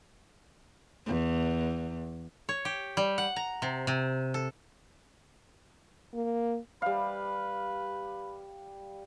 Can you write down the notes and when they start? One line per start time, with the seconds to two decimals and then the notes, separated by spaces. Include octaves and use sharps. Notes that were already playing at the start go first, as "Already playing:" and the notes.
1.07 E2
2.49 C#5
2.65 G4
2.97 G3
3.18 F#5
3.36 A#5
3.62 C3
3.87 C3
4.34 A4
6.14 A#3
6.82 G3 B4 F5